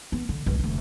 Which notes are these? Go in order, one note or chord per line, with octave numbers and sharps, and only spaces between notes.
B3
D3
B1 G2
F1 D3